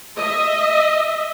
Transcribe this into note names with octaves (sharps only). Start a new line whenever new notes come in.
D#5 E5